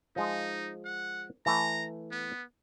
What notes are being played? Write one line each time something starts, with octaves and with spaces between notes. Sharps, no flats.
F3 G#3 D#4
F#5
E3 A3 A#5
B3